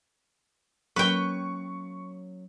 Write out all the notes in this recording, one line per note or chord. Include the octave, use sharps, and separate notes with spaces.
F#3 A#3 C#4 B4 G5 C#6